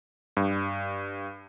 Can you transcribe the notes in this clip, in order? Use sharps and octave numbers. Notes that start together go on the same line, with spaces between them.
G2